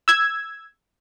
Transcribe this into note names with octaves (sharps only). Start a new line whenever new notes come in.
E6 G#6